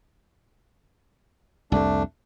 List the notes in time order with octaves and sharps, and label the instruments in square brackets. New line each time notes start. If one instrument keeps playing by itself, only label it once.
[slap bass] C2 F2 [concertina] A3 D4